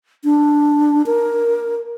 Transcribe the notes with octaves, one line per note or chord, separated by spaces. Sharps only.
D4
A#4